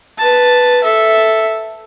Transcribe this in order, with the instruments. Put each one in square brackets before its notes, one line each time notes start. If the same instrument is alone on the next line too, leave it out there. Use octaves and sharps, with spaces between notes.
[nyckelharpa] B4 A5
A4 E5